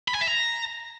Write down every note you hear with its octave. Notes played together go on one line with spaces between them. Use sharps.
B5
G#5
E5
A#5